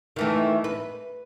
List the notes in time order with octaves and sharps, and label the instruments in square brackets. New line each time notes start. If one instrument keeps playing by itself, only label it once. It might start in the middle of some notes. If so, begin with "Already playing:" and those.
[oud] D#3 E3 A3
B4